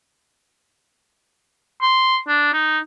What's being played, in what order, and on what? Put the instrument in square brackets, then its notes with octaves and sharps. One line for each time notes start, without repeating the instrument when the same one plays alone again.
[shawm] C6
D4
D#4